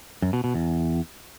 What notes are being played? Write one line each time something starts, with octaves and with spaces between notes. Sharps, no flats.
F#2
B2
B2
E2